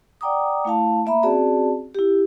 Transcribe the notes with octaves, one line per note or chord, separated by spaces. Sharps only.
D5 F#5 G5 A#5 D6 D#6
A3 E4 F5 A5
A#3 E5 A#5 B5
C4 C#4 F#4 G#4 D5 A5
E4 G4